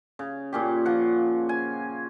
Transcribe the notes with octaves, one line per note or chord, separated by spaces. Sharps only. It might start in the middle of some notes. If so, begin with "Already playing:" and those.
C#3
A#2 C#4 G4
F3 F#5
G#5